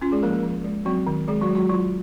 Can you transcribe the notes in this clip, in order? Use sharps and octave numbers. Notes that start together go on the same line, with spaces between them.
C#4 F4
G#3 G#4
F3 A#3 A#4
A#3 A#4
F3
G#3
F#3 C4 F#4
D#3
D#3 G#3 G#4
F#3 F#4
G#3
F#3 F#4
F#3 F4